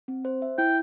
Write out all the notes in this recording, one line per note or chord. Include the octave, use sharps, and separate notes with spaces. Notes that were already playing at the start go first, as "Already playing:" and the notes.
C4
C5
E5
E4 G5